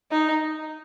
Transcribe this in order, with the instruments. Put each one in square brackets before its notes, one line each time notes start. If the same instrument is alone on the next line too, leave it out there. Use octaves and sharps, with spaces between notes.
[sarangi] D#4